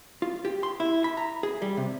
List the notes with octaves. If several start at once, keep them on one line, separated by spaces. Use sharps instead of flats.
F4
G4
C6
E4
B5
A#5
G#4
G3
C3